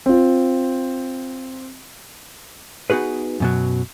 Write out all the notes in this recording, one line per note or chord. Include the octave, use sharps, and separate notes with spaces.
C4 F4
B3 D#4 F#4 G#4 B4
F#2 B2 F#3